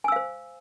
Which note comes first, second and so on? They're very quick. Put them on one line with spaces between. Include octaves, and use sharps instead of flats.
G#5 E6 F5 C5